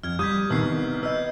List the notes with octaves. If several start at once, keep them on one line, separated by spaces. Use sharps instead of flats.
F2 F6 G#6
G3 D#6 G6 G#6 B6
C2 D#3 B3 E6 C7
B4 D#5 E6 G6